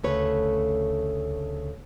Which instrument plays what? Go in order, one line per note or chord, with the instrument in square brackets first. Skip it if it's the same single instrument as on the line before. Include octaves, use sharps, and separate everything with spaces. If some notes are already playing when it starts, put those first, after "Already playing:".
[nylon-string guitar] D2 C#3 A3 B4 C#5